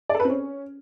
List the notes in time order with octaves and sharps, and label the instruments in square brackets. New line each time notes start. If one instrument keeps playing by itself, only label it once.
[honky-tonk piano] D5
A4
B4
C4
C#4